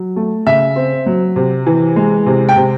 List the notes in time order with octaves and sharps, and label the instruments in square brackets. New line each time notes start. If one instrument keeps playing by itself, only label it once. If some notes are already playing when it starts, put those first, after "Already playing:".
Already playing: [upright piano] F#3
A3
C#3 E5
C4
F#3
C3
E3
G#3
C3
G5
C3